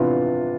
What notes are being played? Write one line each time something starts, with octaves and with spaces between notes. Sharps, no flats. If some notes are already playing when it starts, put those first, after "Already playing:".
Already playing: C3 E3 B3 D4 F4